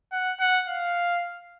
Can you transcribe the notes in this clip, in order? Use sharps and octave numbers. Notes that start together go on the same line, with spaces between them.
F#5
F#5
F5